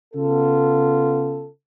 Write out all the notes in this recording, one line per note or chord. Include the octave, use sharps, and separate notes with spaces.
C#3 B3 F4 A4